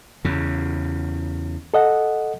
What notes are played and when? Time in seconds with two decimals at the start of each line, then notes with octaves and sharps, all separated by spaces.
0.25 E2 C#3
1.74 A4 D#5 F#5